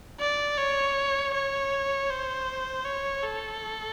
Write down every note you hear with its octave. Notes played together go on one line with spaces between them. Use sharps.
D5
C#5
C#5
C5
C#5
A4